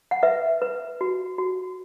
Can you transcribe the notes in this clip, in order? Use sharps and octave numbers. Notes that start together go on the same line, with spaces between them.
F#5
B4 E5
B4
F#4
F#4